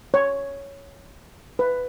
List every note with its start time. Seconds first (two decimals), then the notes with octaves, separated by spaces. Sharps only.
0.14 C#5
1.59 B4